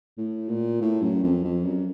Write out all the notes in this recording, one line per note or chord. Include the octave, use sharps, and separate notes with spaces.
A2
A#2
A2
F#2
F2
F2
F#2